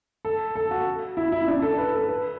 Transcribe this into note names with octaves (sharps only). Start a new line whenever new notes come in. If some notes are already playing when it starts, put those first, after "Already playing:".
A4
A4
F#4
E4
E4
D4
A4
B4
A4
B4